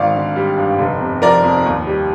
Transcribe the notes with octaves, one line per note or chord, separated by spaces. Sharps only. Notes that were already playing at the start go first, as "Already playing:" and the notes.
Already playing: G#1 D#3 D5 F5
D3
G3
G2
F1
C3
F3 A#4 D5
F2
D#2
G3